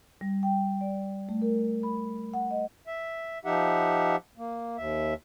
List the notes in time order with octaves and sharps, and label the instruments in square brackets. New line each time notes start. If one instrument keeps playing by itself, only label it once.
[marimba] G3
G5
D5
A3
A#4
B5
F#5
D#5
[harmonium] E5
F3 D#4 G4 E5 F#5
A#3
D#2 E5